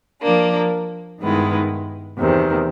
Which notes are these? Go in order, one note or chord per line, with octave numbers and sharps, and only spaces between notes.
F3 A#3 D4
G2 D#3 G#3 B3 E4
E2 C3 D#3